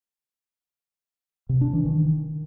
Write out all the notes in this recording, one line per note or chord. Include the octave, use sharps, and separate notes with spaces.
C3
D4
E3
D#3